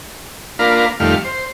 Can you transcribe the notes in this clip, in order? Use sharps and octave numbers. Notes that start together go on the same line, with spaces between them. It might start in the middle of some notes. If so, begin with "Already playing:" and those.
A#3 D4 F4 A#4 B4 F5
F2 D#3 G3 A3 F5 F6
C5